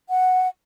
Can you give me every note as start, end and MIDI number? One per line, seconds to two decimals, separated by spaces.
0.10 0.47 78